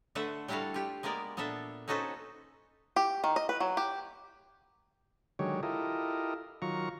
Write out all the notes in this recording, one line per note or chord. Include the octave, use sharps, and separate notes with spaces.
D3 A3 B4 E5 F#5
G3 D4 E4 F#4 A4 F5
F4 G4
G#3 A#3 B3 A#4 D5
A#2 B3 D4 A4 E5
C#4 D#4 F#4 A4 B4 C5
G4
D#3
D#5
B4
F#3
G4
D3 D#3 F#3 G#3 G4 C#5
E4 F4 G4 A4 A#4 D#5
D#3 F#3 F4 A#5 C#6